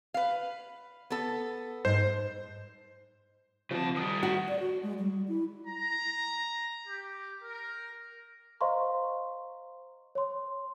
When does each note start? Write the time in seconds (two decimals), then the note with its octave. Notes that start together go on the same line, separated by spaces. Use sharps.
0.14 B4 F5
1.10 B3 A4
1.85 G#2 C5
3.71 C#3 F3 C4 A5
3.96 D#3 G3 D#6
4.23 F#4
4.48 D5
4.60 F#4
4.83 G#3
4.98 G3
5.28 E4
5.66 A#5
6.87 G4
7.43 A#4
8.61 C5 D#5 F5 A#5 C6 C#6
10.15 C#5 C6